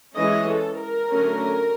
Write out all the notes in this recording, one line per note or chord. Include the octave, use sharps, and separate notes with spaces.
E3 G#3 C#4 E4 D#5
A4
A#4
D3 F#3 A3 C#4